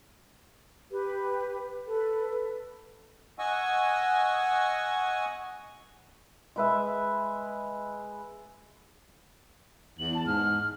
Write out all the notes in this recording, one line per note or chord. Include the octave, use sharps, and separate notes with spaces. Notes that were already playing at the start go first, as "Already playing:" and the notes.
G4 B4
A4 B4
D#5 F#5 G#5 C#6 E6
G#3 B4 E5
E2 F#7
A5
G#2 F6